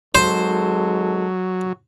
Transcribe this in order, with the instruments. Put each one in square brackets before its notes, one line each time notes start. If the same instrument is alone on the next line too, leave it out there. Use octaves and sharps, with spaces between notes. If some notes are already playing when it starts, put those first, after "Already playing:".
[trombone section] G#1 G#3 A4 [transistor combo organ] F#3 [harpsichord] C5